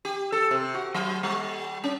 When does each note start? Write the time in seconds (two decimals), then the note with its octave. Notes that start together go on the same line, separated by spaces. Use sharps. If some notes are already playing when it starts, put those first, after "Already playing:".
0.05 G4
0.32 A4
0.51 C3
0.74 F#4
0.94 F#3
1.23 G3
1.84 C#4